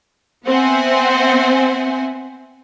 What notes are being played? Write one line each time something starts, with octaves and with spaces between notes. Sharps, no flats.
B3 C4 C5 E5 F#5 G#5